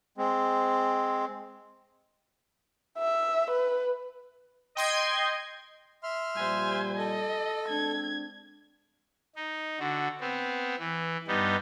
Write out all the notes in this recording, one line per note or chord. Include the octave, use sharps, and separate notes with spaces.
G#3 C4
E5
B4
D#5 G5 C6 G#6
E5 C6 F6
A#2 F3 G3 C5 G#5
A4 D#5
G#3 C4 D4 G#6
D#4
D3 F#4
B3 C4
E3
G2 G3 B3 D#4